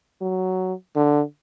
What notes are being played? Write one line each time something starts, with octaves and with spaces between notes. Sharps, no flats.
F#3
D3